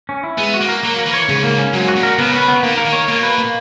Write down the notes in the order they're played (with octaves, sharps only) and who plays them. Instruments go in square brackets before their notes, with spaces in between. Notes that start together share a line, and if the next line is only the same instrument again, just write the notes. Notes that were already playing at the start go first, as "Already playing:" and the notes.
[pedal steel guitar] C#4
E4
[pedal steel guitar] G#3 [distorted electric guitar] B3
[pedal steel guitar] F#4
[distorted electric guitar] A#3
[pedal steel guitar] A#4
[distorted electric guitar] F#3 [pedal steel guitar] A#3
[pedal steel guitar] A#4
[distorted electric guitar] E3
[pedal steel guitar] C#5
[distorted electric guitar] G#2 [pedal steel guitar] C#3
[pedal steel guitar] A#3
C#4
[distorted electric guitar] G#2 [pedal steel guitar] F#3
[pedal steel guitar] F#4
[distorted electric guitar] A#2
[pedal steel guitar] A#4
[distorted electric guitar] C#3 [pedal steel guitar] B3
[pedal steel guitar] B4
B3
[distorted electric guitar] D#3 [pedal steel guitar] A#3
[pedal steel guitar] A#4
[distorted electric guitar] D#3
[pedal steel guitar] C#5
[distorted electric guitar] B2 [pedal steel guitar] A#3
[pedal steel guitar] B4
A#3